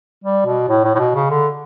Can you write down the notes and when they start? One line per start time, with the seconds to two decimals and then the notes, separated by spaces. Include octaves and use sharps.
0.24 G3
0.46 B2
0.69 A2
0.84 A2
0.95 A2
0.99 B2
1.15 C#3
1.30 D3